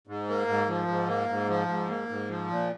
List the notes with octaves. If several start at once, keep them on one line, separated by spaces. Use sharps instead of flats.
G#2
A#3
G#2
F3
G#2
A#3
G#2
F3
G#2
A#3
G#2
F3
A#2